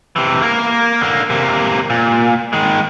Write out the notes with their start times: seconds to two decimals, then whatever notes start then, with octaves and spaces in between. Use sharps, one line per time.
0.16 C3 E3
0.42 A#3 A#4
1.01 D3 A#3
1.30 C3 A#3
1.90 A#2
2.53 D#3 G#3